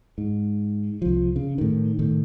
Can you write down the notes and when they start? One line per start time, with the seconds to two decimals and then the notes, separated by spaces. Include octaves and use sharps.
0.18 G#2
1.02 C2 F3
1.36 C#3
1.58 A2 D#3
1.99 A2 D#3 A3